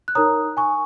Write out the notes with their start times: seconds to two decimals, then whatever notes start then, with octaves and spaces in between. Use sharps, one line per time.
0.08 F#6
0.15 D#4 A#4 C#5 A#5 D#6
0.57 G#5 C#6